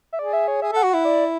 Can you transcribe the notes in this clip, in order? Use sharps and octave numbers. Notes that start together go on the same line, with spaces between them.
E5
G#4 D5
E5
C#5
G#4 E5
A4 F#5
F#4
E4 F#5
D5